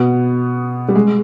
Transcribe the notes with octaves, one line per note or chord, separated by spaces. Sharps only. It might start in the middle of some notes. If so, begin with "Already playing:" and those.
Already playing: B2 B3
G3
G#3